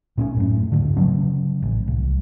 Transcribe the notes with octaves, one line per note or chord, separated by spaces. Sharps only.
A#2 C4 C#4
F#2 A2
D2 G#2 D3
C#3 F3 F#3 C#4
A1
C2